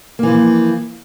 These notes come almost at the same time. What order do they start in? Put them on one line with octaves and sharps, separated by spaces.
A#3 E3 F3